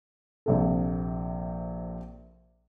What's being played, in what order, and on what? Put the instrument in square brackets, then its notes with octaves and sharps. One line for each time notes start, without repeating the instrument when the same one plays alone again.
[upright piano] A#1 C3 A4